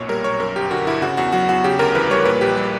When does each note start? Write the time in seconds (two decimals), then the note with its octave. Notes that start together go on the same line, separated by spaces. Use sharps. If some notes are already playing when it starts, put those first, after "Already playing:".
Already playing: B1 F#2 A#2 C#5
0.09 G3 A#4
0.24 B1 C#5
0.40 F#2 A#4
0.56 G1 G4
0.71 D3 F#4
0.87 G1 E4
1.02 C#3 F#4
1.17 E2 F#4
1.32 F#3 F#4
1.49 E2 F#4
1.64 C#3 G4
1.79 D2 A#4
1.95 E3 B4
2.10 G3 C#5
2.25 A#2 B4
2.41 A#1 G4
2.57 G3